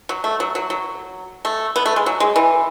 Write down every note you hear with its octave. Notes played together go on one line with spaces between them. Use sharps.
F#3
A3
F#3
F#3
F#3
A3
B3
A3
G#3
F#3
G#3
E3